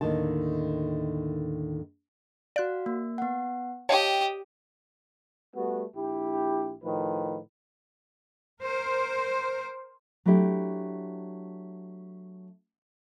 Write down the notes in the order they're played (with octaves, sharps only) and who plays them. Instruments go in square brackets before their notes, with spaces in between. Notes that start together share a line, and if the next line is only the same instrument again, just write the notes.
[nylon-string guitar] D#2 A2 D3 D#3 A5
[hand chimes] F#4 F5 [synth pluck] D5 F#6
[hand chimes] A#3
B3 F#5
[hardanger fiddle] G4 D#6 [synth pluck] C#5 F5 A5 [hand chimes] D#5 G5
[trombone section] G3 A3 B3 F#4
A#1 E4 G4
A2 D#3 F3 B4
[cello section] A#4 C5
[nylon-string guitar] F#3 A3 D4 E4 G4